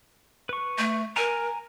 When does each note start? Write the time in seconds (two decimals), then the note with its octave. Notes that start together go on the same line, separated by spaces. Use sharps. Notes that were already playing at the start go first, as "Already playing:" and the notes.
0.49 B4 C#6
0.78 A3
1.16 A#4 G#5 A#5